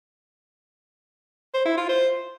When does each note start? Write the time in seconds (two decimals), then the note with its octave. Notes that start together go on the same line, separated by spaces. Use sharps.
1.54 C5
1.66 E4
1.77 F4
1.89 C5